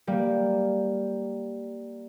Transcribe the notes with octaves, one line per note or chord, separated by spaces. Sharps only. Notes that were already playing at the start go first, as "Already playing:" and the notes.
G3 A#3